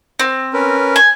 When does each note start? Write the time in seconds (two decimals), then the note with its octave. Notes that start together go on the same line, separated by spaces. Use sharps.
0.20 C4
0.53 C#4 A#4 B4
0.96 G#5